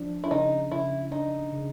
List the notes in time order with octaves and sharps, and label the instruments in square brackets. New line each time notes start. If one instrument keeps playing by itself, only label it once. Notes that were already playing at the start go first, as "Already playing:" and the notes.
Already playing: [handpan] F3 D4
[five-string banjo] E4
[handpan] C#3 [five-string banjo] D#4
[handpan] C#3 [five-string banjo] E4
[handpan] D4 [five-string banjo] D#4
[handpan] C#3